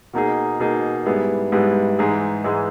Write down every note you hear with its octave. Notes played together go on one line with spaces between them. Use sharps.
B2 A#3 D#4 G#4
B2 A#3 D#4 G#4
G#2 G3 B3 E4 G#4
G#2 G3 B3 E4 G#4
G#2 E3 G#3 D#4 G#4
G#2 E3 G#3 D#4 G#4